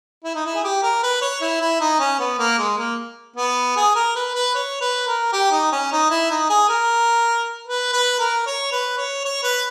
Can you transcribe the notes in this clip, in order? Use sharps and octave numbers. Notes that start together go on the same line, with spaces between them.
E4
D#4
E4
G#4
G4
A#4
B4
C#5
E4
E4
D#4
C#4
B3
A#3
G#3
A#3
B3
G#4
A#4
B4
B4
C#5
B4
A#4
G4
D#4
C#4
D#4
E4
D#4
G#4
A#4
B4
B4
A#4
C#5
B4
C#5
C#5
B4